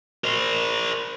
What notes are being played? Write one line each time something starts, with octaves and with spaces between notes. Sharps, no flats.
A#4 C5